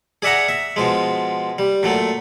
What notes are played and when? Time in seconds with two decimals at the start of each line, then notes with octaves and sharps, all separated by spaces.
0.22 G#4 D5 E5 F#5 A#5
0.48 E5
0.76 B2 F3 G#3
1.58 G3
1.83 A#2 F#3 A3